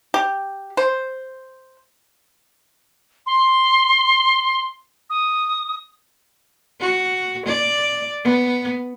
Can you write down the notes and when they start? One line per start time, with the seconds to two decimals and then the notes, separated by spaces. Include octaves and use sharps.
0.14 G4
0.77 C5
3.26 C6
5.10 D#6
6.80 F#4
7.46 D5
8.24 B3